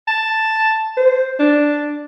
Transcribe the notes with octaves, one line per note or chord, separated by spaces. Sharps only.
A5
C5
D4